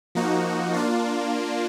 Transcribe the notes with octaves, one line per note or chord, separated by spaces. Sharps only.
F3 A#3 D#4 F#4
A#3 D4 F4